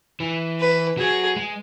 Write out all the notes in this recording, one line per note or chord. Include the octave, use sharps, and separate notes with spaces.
E3
B4
F#3 G#4
G#3